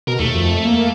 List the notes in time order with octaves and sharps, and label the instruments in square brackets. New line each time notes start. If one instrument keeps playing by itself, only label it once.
[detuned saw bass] B2 [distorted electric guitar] A#4
[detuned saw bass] D#2 [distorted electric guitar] A3
[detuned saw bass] F2
A#3